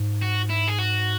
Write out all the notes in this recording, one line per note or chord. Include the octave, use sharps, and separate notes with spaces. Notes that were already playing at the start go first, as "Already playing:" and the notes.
Already playing: G#2
F#4
E4
G#4
F#4